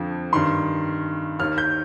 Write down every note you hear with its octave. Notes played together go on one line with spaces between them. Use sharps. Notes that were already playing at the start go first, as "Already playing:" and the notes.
Already playing: F2 D3 F3
G2 D#3 C6
D#2 D#3 F6
G6